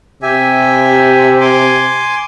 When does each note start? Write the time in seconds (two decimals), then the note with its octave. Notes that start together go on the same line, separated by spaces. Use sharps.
0.23 C3 G4 E5 G#5
1.41 G#5 C6 D6